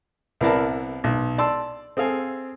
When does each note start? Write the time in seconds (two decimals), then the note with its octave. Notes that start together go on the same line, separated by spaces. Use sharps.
0.41 C2 B3 E4 A#4 D5 A5
1.04 B1
1.38 D5 A5 C6 E6
1.97 C4 G#4 A4 F5 G#5